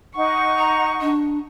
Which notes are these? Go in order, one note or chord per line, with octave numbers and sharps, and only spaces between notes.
D#4 F#5 C#6
A#5
D4